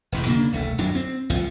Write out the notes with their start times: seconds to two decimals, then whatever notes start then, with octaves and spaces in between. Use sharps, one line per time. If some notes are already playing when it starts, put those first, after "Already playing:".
0.12 E1 A1 E2
0.26 C#3 A#3 C#4 D4
0.53 E1 C2 A3
0.78 D1 F#2 F#3 D4
0.95 C4
1.30 G1 C2 F3